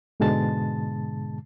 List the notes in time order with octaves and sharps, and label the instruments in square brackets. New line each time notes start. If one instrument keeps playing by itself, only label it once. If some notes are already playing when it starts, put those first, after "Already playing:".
[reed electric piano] G#2 B2 D3 G#3 A5 A6